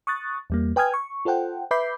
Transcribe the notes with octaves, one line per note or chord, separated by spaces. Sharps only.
C#6 D#6 F#6 A6
E2 G3 A#3
B4 G5 G#5 D#6 F6 G#6
C#6
F4 A4 C5 F#5 G5
B4 E5 B5 D6 G6 C7